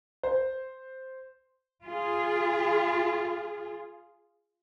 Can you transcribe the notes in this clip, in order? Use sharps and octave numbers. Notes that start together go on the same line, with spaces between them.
C5
F4 G#4